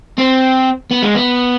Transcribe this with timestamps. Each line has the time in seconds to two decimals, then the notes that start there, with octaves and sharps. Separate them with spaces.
0.18 C4
0.91 B3
1.03 G#3
1.15 B3